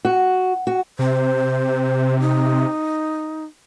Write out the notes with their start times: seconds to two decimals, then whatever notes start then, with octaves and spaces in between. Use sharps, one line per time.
0.05 F#4
0.67 F#4
0.99 C3 C5
2.20 D#4